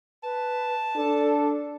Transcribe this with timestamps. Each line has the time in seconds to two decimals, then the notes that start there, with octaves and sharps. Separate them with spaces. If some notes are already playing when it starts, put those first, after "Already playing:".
0.23 B4 A5
0.96 D4 A4